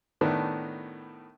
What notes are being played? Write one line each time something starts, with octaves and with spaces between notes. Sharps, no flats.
A2 D#3 A3 B3 D4